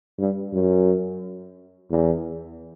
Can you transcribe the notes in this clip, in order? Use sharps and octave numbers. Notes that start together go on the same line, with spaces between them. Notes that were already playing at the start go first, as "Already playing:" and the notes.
G2
F#2
E2